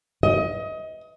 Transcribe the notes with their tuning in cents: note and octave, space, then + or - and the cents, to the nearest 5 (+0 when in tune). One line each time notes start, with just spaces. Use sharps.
D#5 +25